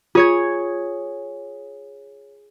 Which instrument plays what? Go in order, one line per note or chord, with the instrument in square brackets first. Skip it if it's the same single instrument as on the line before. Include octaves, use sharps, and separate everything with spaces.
[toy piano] F4 [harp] G#4 C#5 G#6